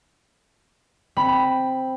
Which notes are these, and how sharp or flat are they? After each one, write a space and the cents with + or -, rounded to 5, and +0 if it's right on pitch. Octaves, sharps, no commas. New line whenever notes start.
C4 +0 B5 +0